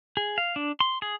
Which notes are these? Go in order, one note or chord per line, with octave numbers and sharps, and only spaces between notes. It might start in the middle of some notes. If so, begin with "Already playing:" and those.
G#4
F5
D4
C6
G#4